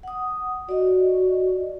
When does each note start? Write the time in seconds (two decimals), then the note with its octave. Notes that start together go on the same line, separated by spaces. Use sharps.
0.03 F#5 D#6
0.69 F#4 D5 D#5